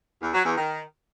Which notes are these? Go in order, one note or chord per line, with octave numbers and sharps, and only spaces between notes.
E2
F#3
E2
D#3